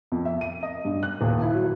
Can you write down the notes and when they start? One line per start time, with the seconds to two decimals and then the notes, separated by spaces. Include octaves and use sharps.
0.12 F2
0.25 E5
0.41 D#7
0.63 D#5
0.85 G2
1.03 F#6
1.21 D#1
1.42 E4
1.54 F#3